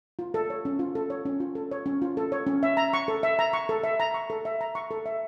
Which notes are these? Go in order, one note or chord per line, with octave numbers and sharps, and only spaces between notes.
F4
A4
C#5
C#4
F4
A4
C#5
C#4
F4
A4
C#5
C#4
F4
A4
C#5
C#4
E5
A#5
C#6
A4
E5
A#5
C#6
A4
E5
A#5
C#6
A4
E5
A#5
C#6
A4
E5